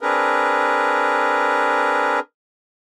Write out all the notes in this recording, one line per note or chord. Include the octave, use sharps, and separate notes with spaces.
C4 D4 G#4 A#4 B4